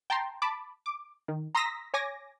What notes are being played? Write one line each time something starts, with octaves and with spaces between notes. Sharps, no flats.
G5 A5 A#5 C6
A5 B5 D6
D6
D#3
A#5 C6 D#6 E6 A#6 B6
C#5 G#5 D6 A#6